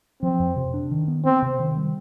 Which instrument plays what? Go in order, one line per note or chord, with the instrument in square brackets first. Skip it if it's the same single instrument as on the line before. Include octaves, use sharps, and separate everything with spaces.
[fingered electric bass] F3 [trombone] C4
[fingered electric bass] F2
C3
D4
D#3
B3
[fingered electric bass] B3 [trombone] C4
[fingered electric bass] C3
D#3
G3